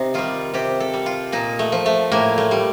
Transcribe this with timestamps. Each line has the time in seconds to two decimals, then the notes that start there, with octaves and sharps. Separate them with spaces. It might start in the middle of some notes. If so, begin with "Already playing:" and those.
Already playing: C3 D#4
0.14 D#3 G3 F4
0.54 C3 G4
0.80 A4
0.93 G3
1.06 F4
1.32 A#2 D#4
1.59 A3
1.72 F3
1.86 A3
2.12 A2 A#3
2.38 A3
2.51 G3